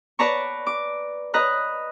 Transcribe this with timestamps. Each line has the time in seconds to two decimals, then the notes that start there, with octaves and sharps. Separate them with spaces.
0.19 B4 D5 A5 A#5 C#6
0.67 D6
1.34 B4 D#5 A#5 F#6